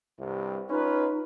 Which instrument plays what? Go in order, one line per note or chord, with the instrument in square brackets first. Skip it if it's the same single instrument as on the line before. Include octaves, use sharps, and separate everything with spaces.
[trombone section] C2 G2 C3
[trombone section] C#4 F4 B4 [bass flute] D#4